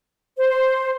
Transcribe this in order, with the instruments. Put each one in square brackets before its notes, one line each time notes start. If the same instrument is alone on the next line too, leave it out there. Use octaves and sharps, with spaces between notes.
[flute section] C5